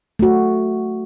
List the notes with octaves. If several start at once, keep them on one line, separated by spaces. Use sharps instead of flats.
A3 F#4